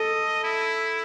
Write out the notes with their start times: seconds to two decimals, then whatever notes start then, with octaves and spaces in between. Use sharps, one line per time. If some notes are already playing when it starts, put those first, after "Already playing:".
Already playing: A4 D#5
0.44 E4